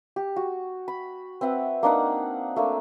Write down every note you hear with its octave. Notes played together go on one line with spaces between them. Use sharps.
G4
F#4
B5
C4 B4 E5 F#5
A#3 D4 D#4 F#5
A3 A#3 D4